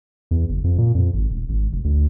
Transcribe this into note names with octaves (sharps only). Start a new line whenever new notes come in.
E2
F#1
F2
A#2
F2
G#1
D#1
G#1
F1
D2